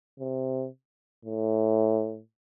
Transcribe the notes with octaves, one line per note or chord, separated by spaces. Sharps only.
C3
A2